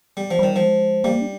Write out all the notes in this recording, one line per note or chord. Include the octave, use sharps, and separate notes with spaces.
G3
F3
D#3 G3
F3
G#3
G3 A#3
D4